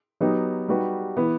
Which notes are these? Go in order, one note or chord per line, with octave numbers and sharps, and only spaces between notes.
F#3 B3 D#4 G4
G3 D#4 F#4 B4
E3 B3 E4 B4